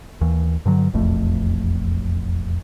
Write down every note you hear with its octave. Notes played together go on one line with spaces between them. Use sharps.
D#2 E3
G2 D3 F#3
E1 A#1 F2 A3